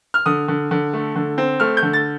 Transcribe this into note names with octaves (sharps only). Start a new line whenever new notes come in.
F6
D3 D#6
D3
D3
A3
D3
C4
A3 F6
G6
D3
A6